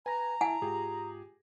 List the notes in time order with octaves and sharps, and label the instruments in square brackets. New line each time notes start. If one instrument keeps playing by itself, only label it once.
[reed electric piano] B4 [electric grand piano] G#5 A#6 [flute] A#5
[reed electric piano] E4 [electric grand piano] E5 A5 [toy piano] F#5 G#5
[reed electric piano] G#2 F4 [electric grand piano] G4 G#4